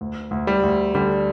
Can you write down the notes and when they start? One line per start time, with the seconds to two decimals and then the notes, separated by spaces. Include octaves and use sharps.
0.01 D2
0.31 D2
0.47 G3
0.63 D2
0.95 D3 G3